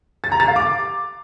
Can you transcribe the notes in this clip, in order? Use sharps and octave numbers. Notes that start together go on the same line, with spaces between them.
A6
A#5
A6
F5
D6